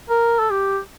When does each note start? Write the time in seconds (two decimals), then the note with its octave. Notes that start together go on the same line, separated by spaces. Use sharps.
0.10 A#4
0.39 A4
0.51 G4